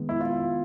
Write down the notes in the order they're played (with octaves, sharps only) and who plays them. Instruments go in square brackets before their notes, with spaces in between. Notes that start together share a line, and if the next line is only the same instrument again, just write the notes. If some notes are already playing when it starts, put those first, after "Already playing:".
Already playing: [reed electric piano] D#3 G#3 B3
[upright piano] E4
F4